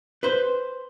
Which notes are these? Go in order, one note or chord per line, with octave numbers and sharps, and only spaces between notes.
B4 C5